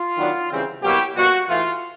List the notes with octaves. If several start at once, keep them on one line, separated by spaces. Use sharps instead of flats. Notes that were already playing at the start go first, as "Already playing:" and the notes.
Already playing: F4
D#3 F#3 B3 D4
C#3 E3 G3 C4
B2 F#3 A#3 C#4 E4 G4
B2 G3 A#3 F#4
A2 E3 A3 F4